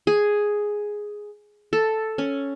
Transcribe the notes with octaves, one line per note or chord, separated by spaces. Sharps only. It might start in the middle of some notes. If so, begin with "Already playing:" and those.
G#4
A4
C#4